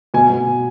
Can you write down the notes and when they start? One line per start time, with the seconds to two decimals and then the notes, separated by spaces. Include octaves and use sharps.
0.14 B2 G#5
0.30 B2